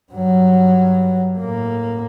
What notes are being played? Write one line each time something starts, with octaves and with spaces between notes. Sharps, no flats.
G2 F#3
A2 A#3